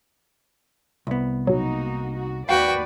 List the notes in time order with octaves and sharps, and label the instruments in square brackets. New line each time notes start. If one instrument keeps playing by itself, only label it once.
[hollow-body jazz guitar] C2 B3
[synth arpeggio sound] B2 F#3 [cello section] A#3 D#4 F#4
[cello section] F#4
[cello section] D#2 B4 D5 [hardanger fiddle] F#4 G5 [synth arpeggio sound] F5